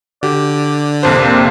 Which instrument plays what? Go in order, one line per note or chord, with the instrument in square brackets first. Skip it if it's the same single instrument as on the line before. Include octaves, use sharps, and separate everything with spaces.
[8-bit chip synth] D3 [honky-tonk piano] G4 [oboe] D5
[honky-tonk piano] A#1 F2 C5 [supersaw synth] C3 A#3 C4 [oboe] D4